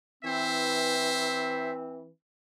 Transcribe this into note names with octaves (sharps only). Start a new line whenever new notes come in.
E3 C4 C5 E5